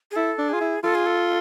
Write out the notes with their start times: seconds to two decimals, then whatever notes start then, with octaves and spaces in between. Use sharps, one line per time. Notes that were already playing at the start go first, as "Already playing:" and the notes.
0.11 G#4
0.16 E4 A4
0.38 D4
0.49 F4 G#4
0.61 E4
0.83 F4 A4
0.95 G#4
1.06 A4